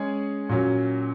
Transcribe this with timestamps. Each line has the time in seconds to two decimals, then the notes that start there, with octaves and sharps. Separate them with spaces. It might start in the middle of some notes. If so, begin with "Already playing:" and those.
Already playing: G#3 C#4 G#4 C#5
0.49 A#2 F#3 C#4